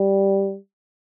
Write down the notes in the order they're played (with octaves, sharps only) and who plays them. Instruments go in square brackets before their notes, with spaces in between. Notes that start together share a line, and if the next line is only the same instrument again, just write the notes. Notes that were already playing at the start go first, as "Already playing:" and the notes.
Already playing: [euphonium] G3